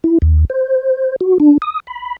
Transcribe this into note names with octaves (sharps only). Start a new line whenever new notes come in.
E4
D#2
C5
F#4
D4
D#6
B5